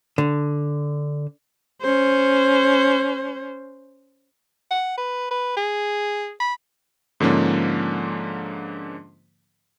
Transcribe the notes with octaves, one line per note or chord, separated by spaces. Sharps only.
D3
C#4 C5
F#5
B4
B4
G#4
B5
G#2 D3 F3 A#3 C#4 D4